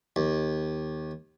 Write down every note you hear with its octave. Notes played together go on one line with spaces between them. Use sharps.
D#2